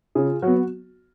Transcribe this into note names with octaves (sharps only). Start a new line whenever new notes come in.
C#3 F4 G#4
F#3 B3 F#4